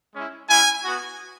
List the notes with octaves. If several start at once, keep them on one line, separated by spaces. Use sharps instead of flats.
G#3 C#4 E4
G#3 C#4 E4 G#5
B3 F#4